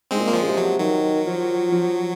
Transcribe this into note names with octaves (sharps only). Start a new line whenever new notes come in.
G#2 G#3 C4
A#2
A#3
F3 G#3
C#3
C3
F#3
D#3 F#3
F3
F3